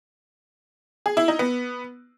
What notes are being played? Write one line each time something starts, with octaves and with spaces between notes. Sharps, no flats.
G#4
E4
D#4
B3